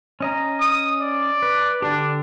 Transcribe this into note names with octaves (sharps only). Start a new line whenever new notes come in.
C#4 D#5 A#5
D#6
D5
B4
D3 D4 G4